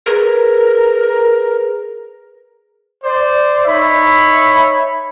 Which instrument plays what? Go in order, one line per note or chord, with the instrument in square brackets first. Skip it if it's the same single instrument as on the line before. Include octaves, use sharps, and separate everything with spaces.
[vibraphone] G#4 B4 [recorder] A#4
[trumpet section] C5 D5
D#4 C#5 E5 B5